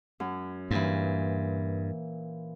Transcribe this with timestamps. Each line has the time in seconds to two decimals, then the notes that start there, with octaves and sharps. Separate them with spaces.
0.20 F#2
0.71 G2 A#2 E3